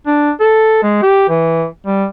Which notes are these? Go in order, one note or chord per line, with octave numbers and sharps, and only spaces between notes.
D4
A4
G#3
G4
E3
G3